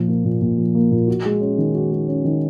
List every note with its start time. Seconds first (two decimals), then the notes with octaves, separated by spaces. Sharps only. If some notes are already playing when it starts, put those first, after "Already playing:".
Already playing: A#2 F3
0.08 A#3
0.25 A#2
0.42 A#2
0.58 F3
0.75 A#3
0.91 A#2
1.08 F#4
1.25 G#3
1.41 C#4
1.58 D#3
1.75 F#4
1.92 G#3
2.08 C#4
2.25 D#3